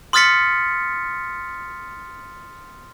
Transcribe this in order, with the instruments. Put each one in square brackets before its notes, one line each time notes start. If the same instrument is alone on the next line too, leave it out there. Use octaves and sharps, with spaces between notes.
[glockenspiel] C6 D#6 F6 A6 B6 C#7